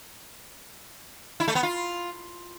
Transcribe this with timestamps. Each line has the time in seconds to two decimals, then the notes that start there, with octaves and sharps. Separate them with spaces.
1.40 E4
1.48 A3
1.55 B3
1.63 F4